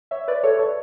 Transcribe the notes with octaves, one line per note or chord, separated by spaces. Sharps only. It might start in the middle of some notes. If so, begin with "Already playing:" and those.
C#5 E5
B4 D5
A4 C#5
A4 C#5